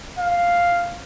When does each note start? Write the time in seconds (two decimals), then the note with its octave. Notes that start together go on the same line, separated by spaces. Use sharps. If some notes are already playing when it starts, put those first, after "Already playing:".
0.19 F5